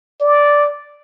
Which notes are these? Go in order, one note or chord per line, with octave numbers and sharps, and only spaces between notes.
D5